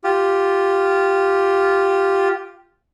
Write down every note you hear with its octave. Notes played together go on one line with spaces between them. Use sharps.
F4 G4